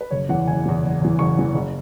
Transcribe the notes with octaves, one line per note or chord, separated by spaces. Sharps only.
B4
F#1 C#5
E2 E3 F#5
F#1 G#5
E2 E3
F#1
E2 E3
F#1 C#6
E2 E3
F#1